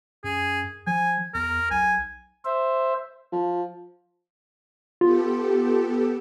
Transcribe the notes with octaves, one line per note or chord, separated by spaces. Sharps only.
F#2 G#4
F3 G#5
E2 A#4
B1 G#5
C5 E5
F3
B3 F4 G4 A4